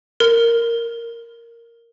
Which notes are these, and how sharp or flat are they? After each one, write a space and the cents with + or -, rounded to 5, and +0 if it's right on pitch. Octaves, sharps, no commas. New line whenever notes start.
A#4 -5